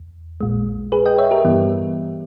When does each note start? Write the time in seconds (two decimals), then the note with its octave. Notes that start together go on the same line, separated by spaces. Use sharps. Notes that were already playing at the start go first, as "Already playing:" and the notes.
Already playing: E2
0.41 A#1 A#2 G#3
0.92 G#4 B4
1.06 D#5 G5
1.18 C#5 E5
1.31 G4 A#4
1.45 G2 E3 G3 B3